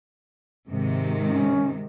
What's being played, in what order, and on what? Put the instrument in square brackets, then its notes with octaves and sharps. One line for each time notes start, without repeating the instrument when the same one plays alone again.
[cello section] G#2 C3 D#3
[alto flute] C#4